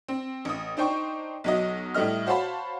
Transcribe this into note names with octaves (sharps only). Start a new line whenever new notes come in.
C4
A1 D#6
D4 D#4 C5 G5 C#6
B1 F#3 D#5
A2 G3 A3 D#5 F6
F#4 C5 C#5 F5 A5 B5